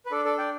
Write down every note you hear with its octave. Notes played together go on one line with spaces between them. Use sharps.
B4
D4 A4 D5
A4 D5
D5 G5